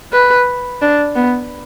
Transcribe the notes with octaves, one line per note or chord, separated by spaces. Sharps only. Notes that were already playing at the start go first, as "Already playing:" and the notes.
B4
D4
B3